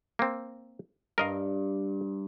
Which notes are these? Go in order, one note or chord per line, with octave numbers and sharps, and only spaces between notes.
A#3 C4
G2 A#4 D#5 F5